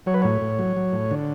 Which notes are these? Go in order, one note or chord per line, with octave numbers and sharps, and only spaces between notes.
F#3 C#5
B4
A2 C#5
A2
F#3
F#3
A2
D3